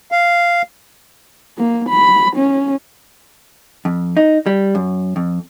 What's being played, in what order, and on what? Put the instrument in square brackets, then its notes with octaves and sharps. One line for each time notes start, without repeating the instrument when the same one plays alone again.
[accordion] F5
[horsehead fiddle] A#3
B5
C#4
[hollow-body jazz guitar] F2
D#4
G3
F#2
F2